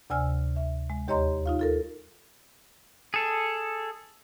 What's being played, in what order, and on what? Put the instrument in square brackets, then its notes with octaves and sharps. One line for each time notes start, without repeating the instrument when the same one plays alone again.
[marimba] D2 C3 D5 G#5 E6 F6
E5
G#3
D#2 G4 C#5 D#5 A#5 C6
D#4 F4 F5
F4 A4 A#4
[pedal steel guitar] G#4 A4